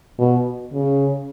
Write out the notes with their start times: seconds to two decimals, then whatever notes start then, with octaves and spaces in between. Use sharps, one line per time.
0.18 B2
0.73 C#3